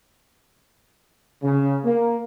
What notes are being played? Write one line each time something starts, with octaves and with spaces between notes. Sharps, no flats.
C#3
A#3